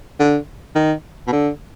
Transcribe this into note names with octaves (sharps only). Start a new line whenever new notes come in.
D3
D#3
B2
D3